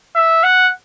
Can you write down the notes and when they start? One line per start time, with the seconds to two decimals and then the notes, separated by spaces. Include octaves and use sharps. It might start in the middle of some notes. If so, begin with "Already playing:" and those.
0.15 E5
0.43 F#5